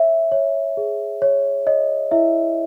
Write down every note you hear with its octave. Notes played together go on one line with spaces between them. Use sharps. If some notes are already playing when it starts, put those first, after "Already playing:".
Already playing: C#5 E5
C#5
G#4
C#5
C#5 D#5
E4 E5